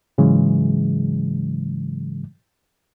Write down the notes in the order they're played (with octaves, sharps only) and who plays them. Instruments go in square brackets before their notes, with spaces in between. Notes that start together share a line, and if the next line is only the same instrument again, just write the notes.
[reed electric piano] G#2 C#3 E3 F#3 G#3